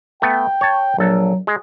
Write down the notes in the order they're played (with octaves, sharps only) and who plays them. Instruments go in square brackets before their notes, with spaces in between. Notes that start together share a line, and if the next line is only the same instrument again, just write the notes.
[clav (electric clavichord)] A3 B3 [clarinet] G5
[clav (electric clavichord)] C#5 A5
[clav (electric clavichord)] A#1 A4 [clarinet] F#3
[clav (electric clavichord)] G#3